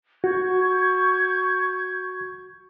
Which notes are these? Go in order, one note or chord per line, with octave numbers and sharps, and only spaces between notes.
F#4 C#6 G6 G#6